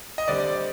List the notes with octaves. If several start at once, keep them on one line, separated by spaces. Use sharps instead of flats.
D#5
D3 G3 C4 D5